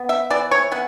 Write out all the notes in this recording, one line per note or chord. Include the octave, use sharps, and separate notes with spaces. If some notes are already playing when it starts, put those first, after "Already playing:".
Already playing: B3
E5
E3 D5
C#5
B3 F#5